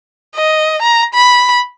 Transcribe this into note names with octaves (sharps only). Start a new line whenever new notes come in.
D#5
A#5
B5